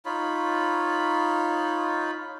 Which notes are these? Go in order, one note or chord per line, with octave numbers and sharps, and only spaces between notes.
D#4 F4 C#5 B5